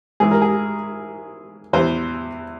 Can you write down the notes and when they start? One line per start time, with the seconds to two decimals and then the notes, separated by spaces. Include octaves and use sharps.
0.20 G#2 E3 G#4
0.31 A#4
0.42 G#4
1.73 E2 E3 C5